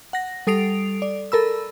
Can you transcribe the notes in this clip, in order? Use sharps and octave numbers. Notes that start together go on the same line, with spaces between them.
F#5 A#6
G3 A4 D#6 C7 D7 F7
D5
A4 A#4 B5 E6